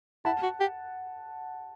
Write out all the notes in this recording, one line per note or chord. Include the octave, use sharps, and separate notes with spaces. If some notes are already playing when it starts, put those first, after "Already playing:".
E4 F#5 A5
F#4
G4